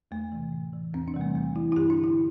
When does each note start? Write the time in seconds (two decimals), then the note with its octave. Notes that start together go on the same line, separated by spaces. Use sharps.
0.11 E2 A3
0.32 C3 E3
0.52 A2
0.73 E3
0.94 E2 C4
1.08 D4
1.14 C3 E3 G3
1.21 A3
1.35 E2 A3
1.55 E3 E4
1.72 E4
1.76 G2 G4
1.90 D4
1.97 D3
2.04 E4